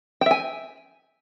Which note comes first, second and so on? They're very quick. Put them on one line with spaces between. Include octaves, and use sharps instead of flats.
G5 E5 G#5